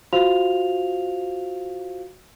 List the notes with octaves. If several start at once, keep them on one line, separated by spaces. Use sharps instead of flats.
F4 F#4 C5 F5 F7